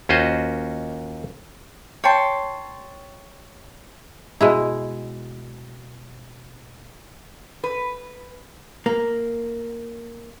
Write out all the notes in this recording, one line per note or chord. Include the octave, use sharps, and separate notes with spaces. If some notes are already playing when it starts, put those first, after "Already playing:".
D#2 C#4 F4 F#4 C5 D#5
C#5 G5 A5 C6
B2 G#3 E4
B4
A#3